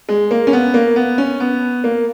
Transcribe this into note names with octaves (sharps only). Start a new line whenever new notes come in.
G#3
A#3
C#4
B3
A#3
B3
C#4
B3
A#3